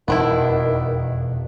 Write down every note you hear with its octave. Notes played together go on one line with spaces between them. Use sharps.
E1 F2 D#3 B3 D4 E4